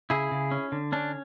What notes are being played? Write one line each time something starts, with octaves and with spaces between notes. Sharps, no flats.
C#3 E4 G#4
C#3
C#4
D3
C#4 D4